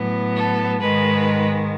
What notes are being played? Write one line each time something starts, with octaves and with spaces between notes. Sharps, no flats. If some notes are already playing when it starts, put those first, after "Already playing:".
Already playing: A2 F#3 B3
A4
G#2 D#3 G#3 B4